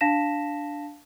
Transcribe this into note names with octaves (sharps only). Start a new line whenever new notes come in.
D4 F5 A5 A#6 B6 E7